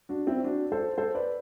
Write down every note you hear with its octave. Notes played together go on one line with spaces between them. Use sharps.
D4 F#4
C4 E4
D4 F#4
A4 C5
A4 C5
B4 D5